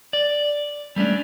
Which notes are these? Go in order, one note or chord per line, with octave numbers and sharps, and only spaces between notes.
D5
G3 A3 C#4 D4